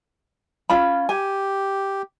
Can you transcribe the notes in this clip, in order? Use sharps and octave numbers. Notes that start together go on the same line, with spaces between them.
C#4 F4 B5
G4 G#5